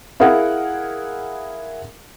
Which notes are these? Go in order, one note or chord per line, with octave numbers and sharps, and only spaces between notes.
E4 G#4 A#4 F5 F#5